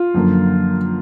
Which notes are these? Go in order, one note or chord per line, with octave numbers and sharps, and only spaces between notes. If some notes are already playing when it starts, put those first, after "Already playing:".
Already playing: F4
F#2 D3 F3 A#3